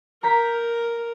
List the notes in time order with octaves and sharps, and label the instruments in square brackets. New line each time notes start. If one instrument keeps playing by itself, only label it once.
[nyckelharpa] A#4 [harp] A#5 G6 B6